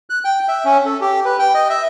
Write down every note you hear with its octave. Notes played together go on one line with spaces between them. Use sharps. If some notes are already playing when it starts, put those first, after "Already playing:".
F#6
G5
E5
C#4
A4
G4
B4
G5
D#5
E5